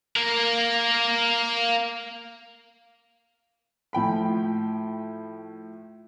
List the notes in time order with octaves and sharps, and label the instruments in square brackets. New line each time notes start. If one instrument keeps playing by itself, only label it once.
[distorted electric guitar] A#3 A#4
[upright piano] A2 F3 G5 B5